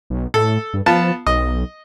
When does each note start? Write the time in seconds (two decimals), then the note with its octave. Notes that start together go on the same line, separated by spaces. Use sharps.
0.10 B1
0.34 A2 A4
0.73 G2
0.86 F3 B3 F4 A5
1.27 B1 D#5